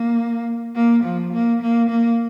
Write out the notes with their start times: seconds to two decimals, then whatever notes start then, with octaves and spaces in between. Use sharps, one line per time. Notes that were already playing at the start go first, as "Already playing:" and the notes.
Already playing: A#3
0.75 A#3
1.04 F3
1.33 A#3
1.62 A#3
1.89 A#3